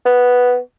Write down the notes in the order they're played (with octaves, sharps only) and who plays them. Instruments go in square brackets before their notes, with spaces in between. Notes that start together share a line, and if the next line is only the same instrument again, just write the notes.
[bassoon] B3